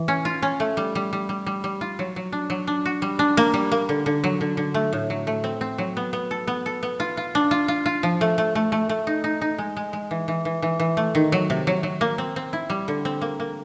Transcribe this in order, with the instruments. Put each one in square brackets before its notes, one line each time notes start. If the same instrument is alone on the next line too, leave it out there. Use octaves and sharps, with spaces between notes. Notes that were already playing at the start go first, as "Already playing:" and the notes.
Already playing: [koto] E3
C#4
F4
C#4
A3
G3
G3
G3
G3
G3
G3
F4
F#3
F#3
D4
F#3
D4
F#4
G3
D4
A#3
G3
A#3
D3
D3
F#3
D3
D3
A3
A2
F#3
A3
C4
C4
F#3
B3
B3
A4
B3
A4
B3
F4
F4
D4
F4
F4
F4
F3
A3
A3
A3
A3
A3
D#4
D#4
D#4
G#3
G#3
G#3
E3
E3
E3
E3
E3
A3
D#3
F#3
C3
F#3
F#3
A#3
C4
C4
E4
G3
D3
C4
A#3
A#3